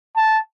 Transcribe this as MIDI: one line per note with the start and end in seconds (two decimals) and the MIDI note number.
0.17 0.39 81